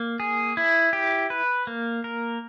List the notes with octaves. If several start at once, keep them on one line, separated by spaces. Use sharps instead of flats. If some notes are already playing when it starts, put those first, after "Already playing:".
Already playing: A#3
G#4
E4
G4
B4
A#3
A#4